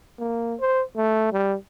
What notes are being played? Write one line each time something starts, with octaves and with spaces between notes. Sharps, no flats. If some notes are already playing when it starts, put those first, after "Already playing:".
A#3
C5
A3
G3